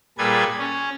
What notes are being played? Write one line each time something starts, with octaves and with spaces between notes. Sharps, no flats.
A#2 G3 G#4 A4 B4 G#6
C#4